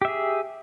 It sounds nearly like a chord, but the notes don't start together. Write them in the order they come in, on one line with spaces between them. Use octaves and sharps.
G4 E5 G#4